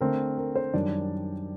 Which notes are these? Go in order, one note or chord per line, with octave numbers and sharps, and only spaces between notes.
D3 A3 C4 A#4
A#4
C5
F#2 D#3 G3 D4 D5